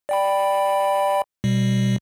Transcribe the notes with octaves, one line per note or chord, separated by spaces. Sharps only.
D5 G5 B5
B2 G3